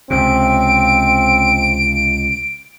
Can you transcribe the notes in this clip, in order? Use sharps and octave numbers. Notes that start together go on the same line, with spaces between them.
C#2 C3 C4 D7